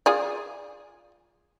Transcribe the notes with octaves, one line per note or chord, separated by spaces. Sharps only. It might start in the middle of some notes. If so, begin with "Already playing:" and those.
F4 G#4 D5